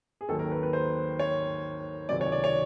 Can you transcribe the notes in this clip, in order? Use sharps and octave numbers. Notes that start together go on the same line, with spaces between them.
G#4
D#2 D#3 F#3 A4
A#4
B4
B4
C5
C#5
C#2 C3 D#3 F#3 D5
C#5
D5
C#5